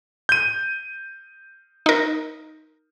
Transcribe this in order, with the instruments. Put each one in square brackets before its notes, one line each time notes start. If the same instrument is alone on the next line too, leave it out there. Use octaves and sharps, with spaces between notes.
[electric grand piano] G6 D#7
[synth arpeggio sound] D#4 A#4